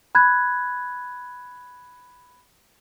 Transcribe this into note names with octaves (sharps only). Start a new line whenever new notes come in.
B5 F#6 G#6